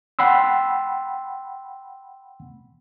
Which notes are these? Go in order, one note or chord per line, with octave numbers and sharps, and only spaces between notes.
F#5 G5 B5 C6 E6